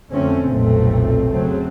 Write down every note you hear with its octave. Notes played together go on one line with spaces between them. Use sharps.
F2 D3 A3 C4 C#4
F1 B1 A#2 A3 C4
C#3 F#3 A3 C4